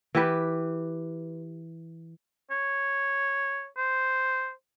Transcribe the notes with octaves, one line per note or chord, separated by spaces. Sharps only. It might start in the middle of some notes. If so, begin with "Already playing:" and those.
E3 G4 B4
C#5
C5